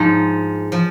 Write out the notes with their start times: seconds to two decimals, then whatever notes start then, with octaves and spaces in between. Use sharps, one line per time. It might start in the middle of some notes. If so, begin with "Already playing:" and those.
Already playing: G#2 F3 F4
0.72 F3